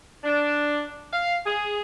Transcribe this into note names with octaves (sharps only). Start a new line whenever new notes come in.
D4
F5
G#4